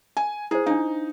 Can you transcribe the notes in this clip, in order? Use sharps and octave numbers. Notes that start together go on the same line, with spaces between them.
G#5
E4 G#4 C5
D4 D#4 F5